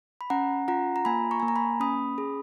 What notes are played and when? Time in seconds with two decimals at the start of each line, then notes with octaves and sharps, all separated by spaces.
0.21 B5
0.30 C#4 F#5 A#5
0.68 F4 F#5 A#5
0.96 A#5
1.05 A#3 G#5 B5
1.31 A#5 C#6
1.40 G#5
1.42 A#3
1.48 A#5
1.56 G#5 B5
1.80 C#4 B5 D#6
2.18 G#4